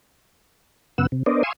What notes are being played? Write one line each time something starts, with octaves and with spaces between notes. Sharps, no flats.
F#2 C#3 B3 F#5 E6
C3
B3 D4 A#4 C5 D5 D#5
F5 G#5 C6 C#6 D#6 E6